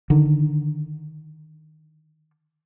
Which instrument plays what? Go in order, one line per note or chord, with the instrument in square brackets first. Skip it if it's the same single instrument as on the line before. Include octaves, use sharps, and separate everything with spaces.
[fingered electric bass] D3 D#3